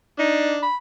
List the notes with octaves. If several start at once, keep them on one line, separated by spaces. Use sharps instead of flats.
D4 D#4
B5